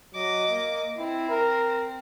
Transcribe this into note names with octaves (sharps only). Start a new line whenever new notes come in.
F#3 D#5 D6
A#3
C4 E4
A#4